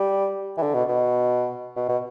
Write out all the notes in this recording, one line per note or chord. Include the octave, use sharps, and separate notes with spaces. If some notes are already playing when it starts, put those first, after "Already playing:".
Already playing: G3
E3
D3
B2
B2
B2
B2